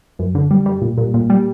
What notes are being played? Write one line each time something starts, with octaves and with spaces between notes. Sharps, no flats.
F#2
D3
G3
G3
A#2
A#2
A#2
G3